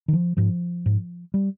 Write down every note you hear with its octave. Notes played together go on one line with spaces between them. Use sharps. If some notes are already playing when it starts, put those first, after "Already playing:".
D#3
F3
G#2 F3
G#2
G3